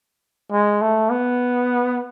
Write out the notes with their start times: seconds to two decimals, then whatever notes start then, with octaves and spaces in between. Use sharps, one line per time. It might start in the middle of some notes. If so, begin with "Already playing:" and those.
0.52 G#3
0.81 A3
1.11 B3